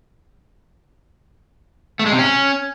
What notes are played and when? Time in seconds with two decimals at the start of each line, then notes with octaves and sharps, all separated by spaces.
1.99 A3
2.06 G#3
2.12 C3
2.18 C#4